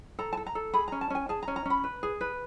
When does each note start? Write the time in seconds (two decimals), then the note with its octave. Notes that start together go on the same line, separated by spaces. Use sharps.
0.19 A4 A#5
0.33 A5
0.37 A4
0.46 A#5
0.55 A4
0.73 G#4 B5
0.88 C#4 A#5
1.01 A5
1.10 C#4 G#5
1.29 G#4 A5
1.43 A#5
1.48 C#4
1.56 A#5
1.65 C#4 B5
1.84 B4
2.03 G#4
2.21 B4